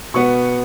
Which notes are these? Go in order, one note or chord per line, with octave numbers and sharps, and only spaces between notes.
B2 B3 C#6